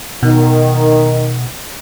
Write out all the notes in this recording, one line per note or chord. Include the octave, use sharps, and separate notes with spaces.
B2 D#3